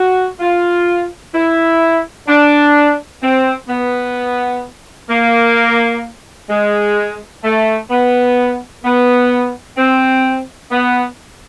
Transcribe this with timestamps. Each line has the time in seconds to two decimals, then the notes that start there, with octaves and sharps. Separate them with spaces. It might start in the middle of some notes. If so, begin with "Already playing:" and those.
Already playing: F#4
0.40 F4
1.34 E4
2.28 D4
3.22 C4
3.68 B3
5.10 A#3
6.50 G#3
7.44 A3
7.90 B3
8.84 B3
9.77 C4
10.72 B3